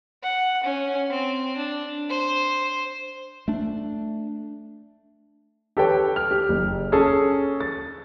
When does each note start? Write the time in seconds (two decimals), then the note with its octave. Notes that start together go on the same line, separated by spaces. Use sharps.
0.22 F#5
0.64 C#4
1.10 C4
1.57 D4
2.09 C5
3.48 A3 D4
5.77 G4 A4 B4 C#5 G5
6.16 F6
6.31 G4
6.49 F#1
6.92 C#4 G#4 A4
7.60 A6